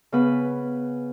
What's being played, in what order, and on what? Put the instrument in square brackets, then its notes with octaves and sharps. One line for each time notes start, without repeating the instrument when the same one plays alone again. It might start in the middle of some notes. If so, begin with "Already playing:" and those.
[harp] C#3 B3 B4